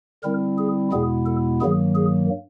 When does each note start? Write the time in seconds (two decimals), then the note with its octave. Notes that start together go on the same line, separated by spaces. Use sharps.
0.23 D3 G3 C4 E4 A#4
0.58 G#4
0.92 E2 B2 G#3 B3 E4 G#4
1.26 A4
1.61 G2 D#3 F#3 A#3 G#4
1.95 G#4